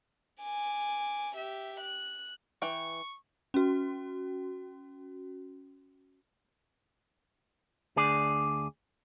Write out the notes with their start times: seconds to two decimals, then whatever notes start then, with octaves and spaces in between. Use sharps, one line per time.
0.43 G#5 D6
1.36 G4 E5
1.81 F#6
2.62 E3 G5 C#6
3.54 C#4 F#4
7.96 D2 D4 G#4 D5